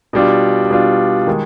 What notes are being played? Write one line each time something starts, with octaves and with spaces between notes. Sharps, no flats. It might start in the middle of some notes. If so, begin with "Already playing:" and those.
B2 G3 D4 F4
B2 G3 D4 F4
D#3 G#3